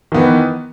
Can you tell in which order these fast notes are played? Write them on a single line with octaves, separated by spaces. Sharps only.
D#3 B3 E3